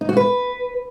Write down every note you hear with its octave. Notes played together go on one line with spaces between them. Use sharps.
D#4
F#4
B4